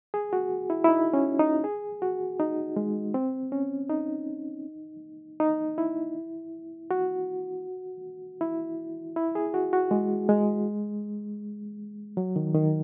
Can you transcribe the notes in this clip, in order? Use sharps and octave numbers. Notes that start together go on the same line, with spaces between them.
G#4
F#4
E4
E4
D#4
C#4
D#4
G#4
F#4
D#4
G#3
C4
C#4
D#4
D#4
E4
F#4
E4
E4
G#4
F#4
F#4
G#3
G#3
F#3
D#3
D#3